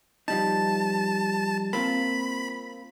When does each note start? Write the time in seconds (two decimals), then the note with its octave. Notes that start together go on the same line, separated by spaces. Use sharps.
0.28 F3 G3 D#4 A5
1.73 A#3 C4 F4 B5